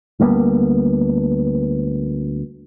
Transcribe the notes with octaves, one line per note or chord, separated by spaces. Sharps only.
D2 G3 A#3 B3